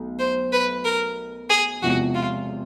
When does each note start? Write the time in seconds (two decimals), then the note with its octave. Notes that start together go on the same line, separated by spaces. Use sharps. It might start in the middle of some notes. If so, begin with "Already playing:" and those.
Already playing: B1 A3
0.19 C5
0.52 B4
0.84 A#4
1.50 G#4
1.82 E1 E2 C3 F3 F#4
2.15 F4